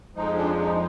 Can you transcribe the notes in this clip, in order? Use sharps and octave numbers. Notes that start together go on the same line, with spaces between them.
F2 F3 G#3 D#4
D4
D#4